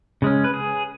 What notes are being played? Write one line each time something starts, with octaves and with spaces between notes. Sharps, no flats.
C#3 G#3 C#4
B4
G#4